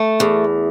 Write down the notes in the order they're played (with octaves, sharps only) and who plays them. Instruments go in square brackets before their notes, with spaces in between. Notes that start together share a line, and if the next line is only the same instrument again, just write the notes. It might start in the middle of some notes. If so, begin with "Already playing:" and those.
Already playing: [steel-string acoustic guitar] A3
E2